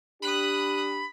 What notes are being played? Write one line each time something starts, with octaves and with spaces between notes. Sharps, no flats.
D4 G4 B5 D#6 F#6